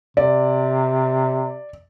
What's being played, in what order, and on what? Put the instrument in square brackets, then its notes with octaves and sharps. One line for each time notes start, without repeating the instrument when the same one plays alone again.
[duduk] C3 [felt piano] D5